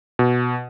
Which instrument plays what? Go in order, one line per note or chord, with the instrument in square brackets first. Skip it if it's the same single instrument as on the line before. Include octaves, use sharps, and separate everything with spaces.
[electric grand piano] B2